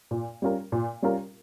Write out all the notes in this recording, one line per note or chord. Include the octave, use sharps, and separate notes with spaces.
A#2
G3 C#4 F4 A#4
A#2
G3 C#4 F4 A#4